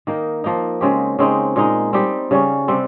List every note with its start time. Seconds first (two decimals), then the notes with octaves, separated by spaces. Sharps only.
0.07 D#3 A#3 D#4
0.44 F3 A#3 D#4
0.81 C#3 G#3 C4 G4
1.19 C#3 G#3 C4 D#4
1.56 A#2 G#3 D#4
1.93 G3 C4 D#4 G4
2.31 C#3 G3 C#4
2.68 C3 G3 C4